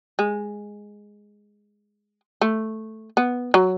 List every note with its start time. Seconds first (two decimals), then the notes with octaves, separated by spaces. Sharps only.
0.19 G#3
2.41 A3
3.17 B3
3.54 F#3